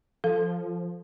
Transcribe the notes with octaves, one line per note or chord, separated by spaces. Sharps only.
F3 A4 F5